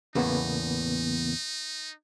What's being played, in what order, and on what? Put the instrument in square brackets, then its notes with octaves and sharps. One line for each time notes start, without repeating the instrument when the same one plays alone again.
[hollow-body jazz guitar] E2 A2 [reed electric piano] C#3 A#3 B3 [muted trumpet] D#4